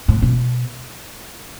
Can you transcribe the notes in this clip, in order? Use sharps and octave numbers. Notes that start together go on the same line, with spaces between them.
A2
B2